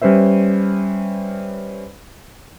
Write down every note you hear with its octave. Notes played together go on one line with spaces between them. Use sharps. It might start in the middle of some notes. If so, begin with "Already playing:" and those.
G3 C#4 B4 C5 E5